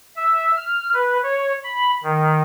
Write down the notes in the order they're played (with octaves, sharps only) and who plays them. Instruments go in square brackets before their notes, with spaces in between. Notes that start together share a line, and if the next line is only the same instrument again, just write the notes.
[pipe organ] E5
F6
B4
C#5
B5
D#3